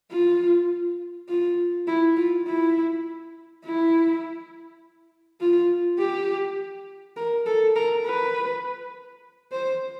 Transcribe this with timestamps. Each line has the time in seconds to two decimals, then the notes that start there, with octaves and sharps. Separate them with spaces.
0.11 F4
1.29 F4
1.87 E4
2.17 F4
2.46 E4
3.64 E4
5.40 F4
5.99 G4
7.17 A#4
7.46 A4
7.76 A#4
8.05 B4
9.52 C5